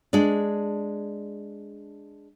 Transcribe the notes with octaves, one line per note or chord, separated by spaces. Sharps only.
G#3 D4